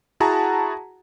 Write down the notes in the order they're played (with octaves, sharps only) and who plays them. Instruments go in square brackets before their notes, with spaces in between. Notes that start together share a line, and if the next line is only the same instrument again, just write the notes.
[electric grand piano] E4 F#4 G#4 F#5 A5 A#5